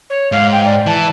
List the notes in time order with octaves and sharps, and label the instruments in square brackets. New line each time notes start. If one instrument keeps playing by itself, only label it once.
[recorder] C#5
[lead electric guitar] G#2 [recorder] F5
[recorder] G5
D5
[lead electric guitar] E3 [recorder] A5